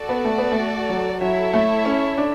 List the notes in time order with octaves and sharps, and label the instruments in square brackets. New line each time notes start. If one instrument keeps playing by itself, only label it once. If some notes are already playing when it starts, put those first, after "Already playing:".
Already playing: [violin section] F#4 A4 D5
[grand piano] B3
A3
B3
A3
F#3
[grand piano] F#3 [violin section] E4 A4 C#5 E5
[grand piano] A3
C#4
D4